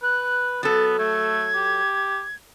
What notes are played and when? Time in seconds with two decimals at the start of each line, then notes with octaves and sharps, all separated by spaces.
0.02 B4 F#6
0.63 F#3 B3 A4 A6
0.99 A3 G#6
1.55 G4